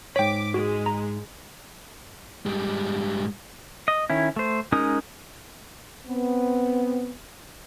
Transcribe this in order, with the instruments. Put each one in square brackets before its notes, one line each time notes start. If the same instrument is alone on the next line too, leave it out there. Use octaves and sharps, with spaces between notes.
[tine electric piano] G#2 B6 [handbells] C#5 G5 [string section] D6
[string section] G#3 [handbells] F#4
[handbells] A#5
[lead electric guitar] G#2 G3
[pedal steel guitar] D#5
D#3 C#4 E4
A3 C5
G#3 C#4 D#4 A#4 D#6
[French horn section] B3 C4